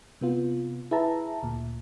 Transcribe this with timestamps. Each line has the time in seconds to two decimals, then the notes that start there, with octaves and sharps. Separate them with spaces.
0.21 C3 B3 F4
0.91 E4 G#4 B4 E5 A5 A#5
1.42 D2 A#2